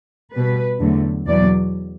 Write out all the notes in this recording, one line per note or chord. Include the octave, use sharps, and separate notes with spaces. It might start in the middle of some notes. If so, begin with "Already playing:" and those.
B2 G3 B4
E2 D3 F#3 A3
E2 B2 F#3 D5